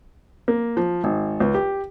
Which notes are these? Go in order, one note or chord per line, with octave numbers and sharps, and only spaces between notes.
A#3
F3
G#1
C#2
G4